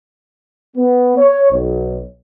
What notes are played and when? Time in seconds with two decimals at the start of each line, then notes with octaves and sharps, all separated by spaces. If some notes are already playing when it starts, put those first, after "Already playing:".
0.77 B3
1.17 C#5
1.52 B1